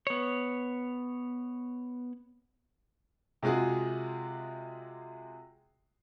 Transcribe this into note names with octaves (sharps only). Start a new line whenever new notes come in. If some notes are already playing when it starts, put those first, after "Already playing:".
B3 C#5
C3 G#3 F4 F#4 G#4